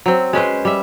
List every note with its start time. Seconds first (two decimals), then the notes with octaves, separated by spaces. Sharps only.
0.06 F#3 C4
0.33 G#3 C#4 B4 C5
0.65 G3 E5